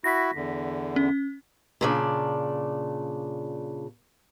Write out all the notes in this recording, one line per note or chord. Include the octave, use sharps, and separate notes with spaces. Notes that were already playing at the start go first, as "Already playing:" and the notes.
E4 F#4 A#6 B6
E2 D3
C#4
A#2 C#3 D4